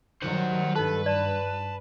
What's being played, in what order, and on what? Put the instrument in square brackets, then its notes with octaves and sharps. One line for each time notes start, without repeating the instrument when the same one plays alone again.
[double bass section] D#3 F#3 G3 [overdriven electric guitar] C5 F#5
[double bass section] G2 [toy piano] D#4 A5 [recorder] A4 [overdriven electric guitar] B4
[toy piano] D5 [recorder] A5